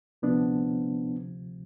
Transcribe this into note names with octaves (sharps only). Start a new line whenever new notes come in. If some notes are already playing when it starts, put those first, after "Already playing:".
D2 C3 F3 B3 D4